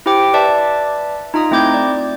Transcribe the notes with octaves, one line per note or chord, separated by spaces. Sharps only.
E4 G4 C5 G5 D6
B4 D5 E5 A5
D#4 F4 A#5 D#6
A3 C4 E4 D6 G6 G#6
D5